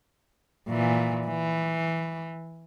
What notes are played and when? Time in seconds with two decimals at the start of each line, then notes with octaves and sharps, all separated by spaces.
0.69 A#2 E3
1.27 E3